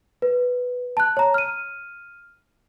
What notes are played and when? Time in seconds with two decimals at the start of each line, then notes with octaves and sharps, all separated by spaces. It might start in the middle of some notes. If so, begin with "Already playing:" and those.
0.22 B4
0.97 A5 F#6
1.17 C#5 A#5
1.34 F6 D#7